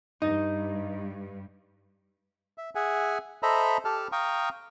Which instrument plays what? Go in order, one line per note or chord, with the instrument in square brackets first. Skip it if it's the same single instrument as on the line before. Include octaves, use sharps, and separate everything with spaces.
[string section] G2 [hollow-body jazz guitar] D#4
[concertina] E5
G#4 E5 F#5 G#5
A4 C5 D#5 E5 A#5 B5
G4 A4 A5 F6
F5 G5 A#5 C#6 D#6